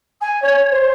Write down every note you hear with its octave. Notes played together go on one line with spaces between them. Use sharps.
G#5
C#5
C5